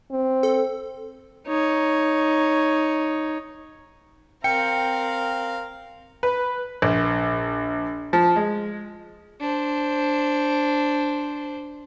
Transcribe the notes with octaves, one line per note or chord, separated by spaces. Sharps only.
C4
A4
D#4 C#5
C4 A#4 F5 G5 C#7
B4
A#1
F3
G#3
D4 C5